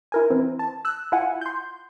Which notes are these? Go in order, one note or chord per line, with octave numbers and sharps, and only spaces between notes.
E4 A#4 G#5
E3 C4
A5
E6 F#6
E4 F4 F#5 G#5
C6 G6